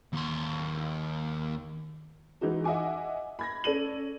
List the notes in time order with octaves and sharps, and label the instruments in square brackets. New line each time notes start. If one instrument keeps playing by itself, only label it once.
[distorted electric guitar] D#2 C6
[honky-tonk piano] E3 G#3 D#4 F#4
D#5 E5 F#5 G#5 D6
B5 G#6 A#6
C#4 A4 D5 D#7 F#7